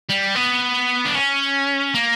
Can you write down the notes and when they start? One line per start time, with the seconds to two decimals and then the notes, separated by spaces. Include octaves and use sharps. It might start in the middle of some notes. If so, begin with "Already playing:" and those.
0.10 G3
0.36 B3
1.05 D4
1.15 C#4
1.94 A#3